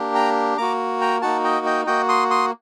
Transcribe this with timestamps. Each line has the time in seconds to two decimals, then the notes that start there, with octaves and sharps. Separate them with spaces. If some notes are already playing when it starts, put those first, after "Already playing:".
Already playing: A#3 D4 G4
0.15 G5 A#5
0.58 A#3 F#4 A#5 D6
1.01 G5 A#5
1.22 A#3 D#4 F#4 F#5 A5
1.44 D#5 G5
1.66 D#5 G5
1.87 A#3 F#4 D#5 G5
2.09 C6 D#6
2.30 C6 D#6